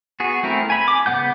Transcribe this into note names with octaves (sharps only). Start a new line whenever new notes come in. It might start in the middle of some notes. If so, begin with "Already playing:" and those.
B3 F#4 G#4
A3 C4 E4 A#4
G#5 B5
D6
C#3 A3 B3 F#5 G6